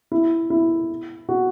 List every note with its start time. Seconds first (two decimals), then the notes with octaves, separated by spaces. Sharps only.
0.12 E4
0.50 E4
1.29 F#4